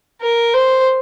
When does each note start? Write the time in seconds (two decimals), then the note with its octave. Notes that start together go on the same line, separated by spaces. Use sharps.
0.21 A#4
0.54 C5